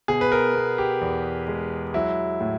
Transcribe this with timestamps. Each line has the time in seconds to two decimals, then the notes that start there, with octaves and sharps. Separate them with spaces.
0.08 B2 G#4
0.21 B4
0.32 A#4
0.55 B3
0.78 G4
1.01 E2
1.48 G#3
1.94 F#3 E4
2.41 A2